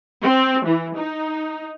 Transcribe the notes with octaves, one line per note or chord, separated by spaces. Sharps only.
C4
E3
D#4